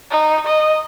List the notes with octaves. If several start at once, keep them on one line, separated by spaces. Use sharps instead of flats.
D#4
D#5